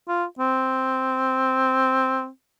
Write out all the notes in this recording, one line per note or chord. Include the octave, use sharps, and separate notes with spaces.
F4
C4